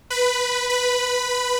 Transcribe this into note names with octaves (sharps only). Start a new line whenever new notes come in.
B4 B5
B4 B5